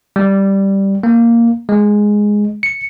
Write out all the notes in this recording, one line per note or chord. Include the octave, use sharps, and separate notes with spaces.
G3
A#3
G#3
C#7